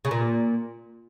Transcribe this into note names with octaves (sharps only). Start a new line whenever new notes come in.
C#3
A#2